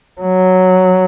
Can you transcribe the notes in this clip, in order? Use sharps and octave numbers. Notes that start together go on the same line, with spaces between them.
F#3